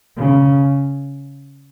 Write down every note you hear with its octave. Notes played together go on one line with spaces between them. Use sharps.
C#3